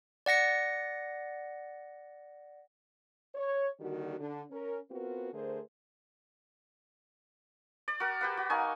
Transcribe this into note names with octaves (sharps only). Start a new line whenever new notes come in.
D5 F#5 A#6 C#7
C#5
D3 D#3 G3 A#3 F#4
D3 D4
C#4 A#4
B3 C4 F4 F#4 A#4 B4
D3 A3 G#4 A#4 C5
D5
F#4 A#4
G4 B4 F#5
F#4
A#3 D#4 G#5 C#6